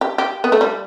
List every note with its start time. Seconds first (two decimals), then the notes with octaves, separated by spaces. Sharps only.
0.01 G4
0.18 G4
0.44 B3
0.52 A3
0.61 G3